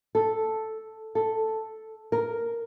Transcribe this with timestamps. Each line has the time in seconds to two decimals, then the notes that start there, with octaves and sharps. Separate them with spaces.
0.15 A4
1.15 A4
2.12 A#4